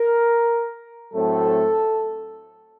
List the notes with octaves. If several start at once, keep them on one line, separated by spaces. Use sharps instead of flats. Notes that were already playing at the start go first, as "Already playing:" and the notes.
Already playing: A#4
A2 F#3 A3 C4 A4